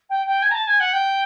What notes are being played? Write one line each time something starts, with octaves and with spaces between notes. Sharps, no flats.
G5
G5
G#5
A#5
A5
G#5
F#5
G5